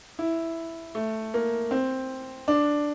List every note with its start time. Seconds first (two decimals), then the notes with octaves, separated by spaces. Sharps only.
0.19 E4
0.95 A3
1.34 A#3
1.71 C4
2.48 D4